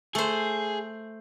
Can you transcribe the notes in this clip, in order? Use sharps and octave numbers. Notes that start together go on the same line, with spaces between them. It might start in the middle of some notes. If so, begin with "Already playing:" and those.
A3 G#4 C5